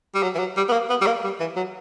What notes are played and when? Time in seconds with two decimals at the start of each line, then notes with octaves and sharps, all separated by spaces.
0.15 G3
0.23 F#3
0.35 E3
0.39 F#3
0.57 G3
0.69 B3
0.73 A#3
0.90 B3
1.01 G3
1.07 A#3
1.24 G3
1.40 E3
1.56 F#3